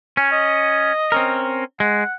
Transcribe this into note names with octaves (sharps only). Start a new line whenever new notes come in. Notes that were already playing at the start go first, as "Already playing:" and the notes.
C#4 G#5
D#5
C4 C#4 A#4
G#3 F#5